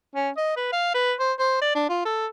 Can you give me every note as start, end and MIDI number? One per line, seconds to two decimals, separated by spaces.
0.15 0.30 61
0.37 0.56 75
0.56 0.72 71
0.73 0.92 77
0.94 1.13 71
1.20 1.33 72
1.39 1.60 72
1.61 1.73 74
1.75 1.87 62
1.89 2.00 65
2.05 2.26 69